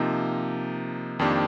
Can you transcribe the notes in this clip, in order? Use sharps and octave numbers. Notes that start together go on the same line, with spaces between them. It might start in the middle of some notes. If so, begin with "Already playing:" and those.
Already playing: C3 F3 A#3 D#4
F2 D#3 A#3 D4 G4